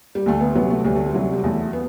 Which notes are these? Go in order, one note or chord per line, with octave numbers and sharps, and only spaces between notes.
G3
D2 A3
B3
C3 F#3 B3
A3
D2 G3
A3
G3
C3 F#3
G3
E2 A3
B3